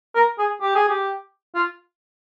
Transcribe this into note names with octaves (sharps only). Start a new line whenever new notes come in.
A#4
G#4
G4
G#4
G4
F4